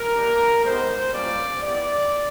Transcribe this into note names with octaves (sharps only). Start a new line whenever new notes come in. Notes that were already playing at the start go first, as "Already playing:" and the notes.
Already playing: A#4
A#3 D4 G4
G#3 B3 D#4 G4 C5
G3 A#3 C#4 F4 D5
B3 E4 G4 D5